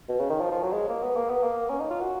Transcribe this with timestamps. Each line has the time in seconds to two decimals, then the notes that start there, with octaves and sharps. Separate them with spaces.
0.09 B2
0.19 C#3
0.30 D#3
0.41 F3
0.51 F3
0.63 F#3
0.73 G#3
0.89 A#3
1.03 B3
1.16 A#3
1.29 B3
1.44 A#3
1.69 C#4
1.80 D#4
1.90 F4
2.01 F#4